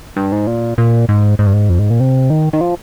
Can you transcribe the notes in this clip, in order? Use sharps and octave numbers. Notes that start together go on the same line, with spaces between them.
G2
G#2
A#2
A#2
G#2
G#2
G2
G#2
F2
G#2
A#2
C3
D#3
D#3
F3